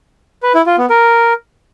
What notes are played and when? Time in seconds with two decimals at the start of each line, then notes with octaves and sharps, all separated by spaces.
0.43 B4
0.55 E4
0.66 F4
0.78 B3
0.90 A#4